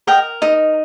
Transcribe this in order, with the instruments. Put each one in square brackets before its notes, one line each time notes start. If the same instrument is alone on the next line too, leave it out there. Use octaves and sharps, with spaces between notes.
[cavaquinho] A#4 D#5 G5
D#4 D#5